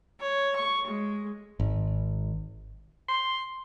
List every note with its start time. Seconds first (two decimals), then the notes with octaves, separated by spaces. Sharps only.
0.20 C#5
0.56 C#6
0.87 G#3
1.60 G#1
3.09 C6